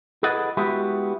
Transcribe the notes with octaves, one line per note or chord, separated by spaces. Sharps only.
E4 G#4 A4 B4 D#5 F#5
G#3 B3 E4 F#4 G4